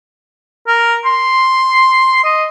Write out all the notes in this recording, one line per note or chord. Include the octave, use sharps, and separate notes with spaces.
A#4
C6
D#5